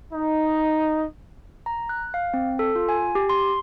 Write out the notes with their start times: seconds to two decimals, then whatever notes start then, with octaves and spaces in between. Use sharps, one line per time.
0.13 D#4
1.66 A#5
1.89 F#6
2.14 F5
2.34 C4
2.59 A4
2.76 F4
2.89 G#5
3.15 G4
3.29 C6